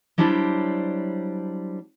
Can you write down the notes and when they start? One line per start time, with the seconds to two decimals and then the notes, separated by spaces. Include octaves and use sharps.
0.18 F#3 G3 D4 E4 C5 A5